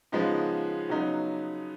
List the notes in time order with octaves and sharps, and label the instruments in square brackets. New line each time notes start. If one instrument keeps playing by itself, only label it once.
[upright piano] C#3 F3 G#3 B3 D#4
C#3 F#3 B3 D#4